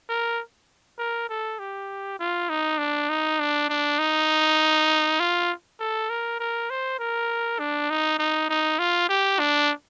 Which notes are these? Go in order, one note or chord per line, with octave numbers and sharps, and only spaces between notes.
A#4
A#4
A4
G4
F4
D#4
D4
D#4
D4
D4
D#4
F4
A4
A#4
A#4
C5
A#4
D4
D#4
D#4
D#4
F4
G4
D4